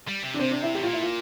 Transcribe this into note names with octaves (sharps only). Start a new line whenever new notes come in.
G3
C3
D4
C3 C4
D4
E4
A2 G4
A#2 F4
E4
F4